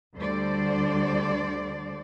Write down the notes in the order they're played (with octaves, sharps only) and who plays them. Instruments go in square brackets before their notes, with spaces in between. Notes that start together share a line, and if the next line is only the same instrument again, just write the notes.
[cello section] D2 D3 G3 C5 D5